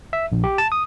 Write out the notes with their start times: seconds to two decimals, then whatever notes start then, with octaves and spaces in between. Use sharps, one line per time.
0.13 E5
0.32 A#1
0.44 G4
0.58 A5
0.72 D#6